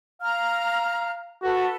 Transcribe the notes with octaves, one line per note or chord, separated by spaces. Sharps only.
F5 A#5 F6
F#4 A4 B4